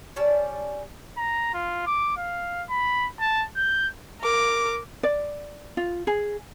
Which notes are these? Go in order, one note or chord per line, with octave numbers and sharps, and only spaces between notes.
G3 C#4 D5 A5
A#5
F4
D6
F5
B5
A5
G6
A#4 D6
D5
F4
G#4